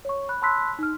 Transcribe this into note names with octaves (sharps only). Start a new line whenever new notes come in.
C#5 C#6
B5 F#6
A5 B5 C6 E6 F#6 B6
D#4 F6